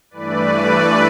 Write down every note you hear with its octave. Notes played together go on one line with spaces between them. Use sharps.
G2 E3 A3 B4 D5